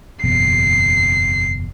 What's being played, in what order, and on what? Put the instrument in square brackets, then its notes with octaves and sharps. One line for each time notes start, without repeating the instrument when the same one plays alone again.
[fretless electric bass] F#1 E2 B2 [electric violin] C7